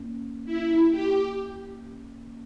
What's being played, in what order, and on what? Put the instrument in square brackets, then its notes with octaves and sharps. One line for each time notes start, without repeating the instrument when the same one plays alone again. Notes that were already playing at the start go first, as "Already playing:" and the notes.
Already playing: [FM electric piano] E2 A#3 C#4
[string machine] E4
G4